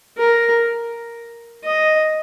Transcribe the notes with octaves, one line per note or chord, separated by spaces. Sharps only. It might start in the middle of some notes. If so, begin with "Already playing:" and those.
A#4
D#5